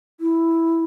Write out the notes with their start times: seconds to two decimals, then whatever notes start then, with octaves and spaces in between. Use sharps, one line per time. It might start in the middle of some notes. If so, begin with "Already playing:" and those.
0.21 E4